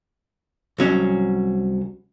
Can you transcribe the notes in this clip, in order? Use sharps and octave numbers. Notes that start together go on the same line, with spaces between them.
C2 F#3 C#4